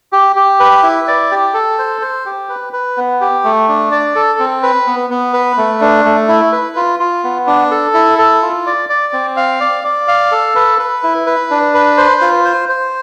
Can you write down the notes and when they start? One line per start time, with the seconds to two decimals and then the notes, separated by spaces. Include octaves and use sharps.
0.12 G4
0.36 G4
0.60 B4
0.83 E4
1.08 D5
1.31 G4
1.54 A4
1.79 C5
2.02 C5
2.26 G4
2.49 B4
2.73 B4
2.97 B3
3.21 G4
3.44 A3
3.68 D4
3.92 D5
4.15 A4
4.39 C4
4.63 B4
4.87 B3
5.10 B3
5.33 B4
5.57 A3
5.81 D4
6.05 A3
6.28 E4
6.52 B4
6.76 F4
7.00 F4
7.24 B3
7.47 D4
7.71 A4
7.94 E4
8.19 A4
8.42 F4
8.66 D5
8.89 D5
9.13 C4
9.37 F5
9.60 D5
9.84 D5
10.08 F5
10.32 A4
10.56 B4
10.79 B4
11.03 E4
11.26 B4
11.51 D4
11.74 B4
11.98 C5
12.21 F4
12.45 C5
12.69 C5